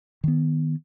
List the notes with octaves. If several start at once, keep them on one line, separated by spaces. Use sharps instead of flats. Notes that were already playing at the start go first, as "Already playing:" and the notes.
D#3 B3